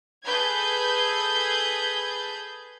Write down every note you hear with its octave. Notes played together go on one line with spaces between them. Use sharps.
G#4 A4 B4 G6 G#6